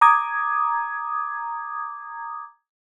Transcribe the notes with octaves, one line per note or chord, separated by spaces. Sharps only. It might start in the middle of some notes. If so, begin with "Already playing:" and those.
A#5 D6 D#6 G#6